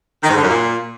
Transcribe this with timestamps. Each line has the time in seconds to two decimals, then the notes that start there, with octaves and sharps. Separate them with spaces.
0.23 D#3
0.30 G#2
0.36 D3
0.42 F#2
0.49 A#2